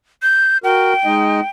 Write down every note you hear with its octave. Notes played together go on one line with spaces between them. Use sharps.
G6
F#4 A#4 G5
G#3 D#4 D#5